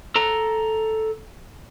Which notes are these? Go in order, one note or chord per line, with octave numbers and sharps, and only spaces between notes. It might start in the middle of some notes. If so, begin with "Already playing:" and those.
A4 A#5